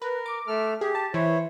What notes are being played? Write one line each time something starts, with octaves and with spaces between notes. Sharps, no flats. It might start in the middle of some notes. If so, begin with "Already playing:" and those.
A#4 B4
D6
A3 A4 F6
G4 G#4
A5
E3 E4 C5 C#5